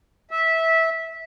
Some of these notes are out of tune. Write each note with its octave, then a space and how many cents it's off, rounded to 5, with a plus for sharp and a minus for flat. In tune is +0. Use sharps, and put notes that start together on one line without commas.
E5 -15